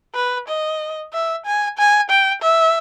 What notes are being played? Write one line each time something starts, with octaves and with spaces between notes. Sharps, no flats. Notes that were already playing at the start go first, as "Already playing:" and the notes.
B4
D#5
E5
G#5
G#5
G5
E5